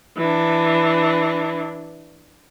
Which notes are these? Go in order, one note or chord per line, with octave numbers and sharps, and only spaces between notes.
E3 D4